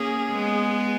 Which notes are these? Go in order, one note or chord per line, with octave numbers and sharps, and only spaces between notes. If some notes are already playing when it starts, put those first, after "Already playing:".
Already playing: A#3 C#4 G#4
G#3 B3